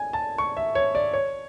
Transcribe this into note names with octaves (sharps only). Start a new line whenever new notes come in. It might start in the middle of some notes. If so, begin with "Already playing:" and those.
Already playing: G#5
A5
C#6
E5
C#5
D5
C#5